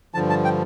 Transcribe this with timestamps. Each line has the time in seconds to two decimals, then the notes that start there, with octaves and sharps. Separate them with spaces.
0.14 G2 D3 F3 A5
0.30 A5
0.44 G5